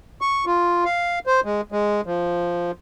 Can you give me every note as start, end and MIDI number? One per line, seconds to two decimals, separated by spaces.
0.21 0.45 85
0.46 0.84 65
0.85 1.19 77
1.27 1.40 72
1.45 1.61 56
1.72 2.01 56
2.06 2.71 53